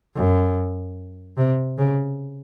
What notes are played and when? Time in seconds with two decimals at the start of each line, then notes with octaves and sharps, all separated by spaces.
0.16 F#2
1.37 C3
1.78 C#3